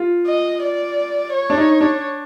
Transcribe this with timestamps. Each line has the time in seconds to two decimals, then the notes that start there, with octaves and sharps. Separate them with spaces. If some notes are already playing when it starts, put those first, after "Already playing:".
Already playing: F4
0.27 D#5
0.63 D5
1.34 C#5
1.50 D4
1.58 D#4
1.81 D4